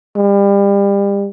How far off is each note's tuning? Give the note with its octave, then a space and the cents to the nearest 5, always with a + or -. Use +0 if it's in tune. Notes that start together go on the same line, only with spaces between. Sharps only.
G3 +30